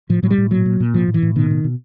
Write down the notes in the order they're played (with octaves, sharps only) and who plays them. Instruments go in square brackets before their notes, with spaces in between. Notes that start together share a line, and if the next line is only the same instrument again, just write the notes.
[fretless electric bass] A2 F3
A2 F#3
G3
A2
A#2 F#3
A#2
A#2
A2 F3
A2
E3
A2
B2 D#3
B2
B2